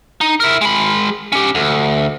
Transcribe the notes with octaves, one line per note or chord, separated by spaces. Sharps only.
D#4
E4 A#4
G#3 B5
C#4 G4
D2